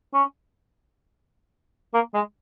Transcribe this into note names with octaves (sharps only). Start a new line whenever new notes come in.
C#4
A#3
G#3